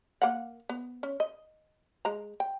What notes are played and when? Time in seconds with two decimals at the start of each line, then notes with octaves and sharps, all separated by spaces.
0.22 A#3 F5 F#5
0.69 B3
1.03 C#4
1.20 D#5
2.05 G#3 A#5
2.40 G5